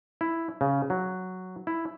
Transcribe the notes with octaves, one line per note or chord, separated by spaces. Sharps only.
E4
C#3
F#3
E4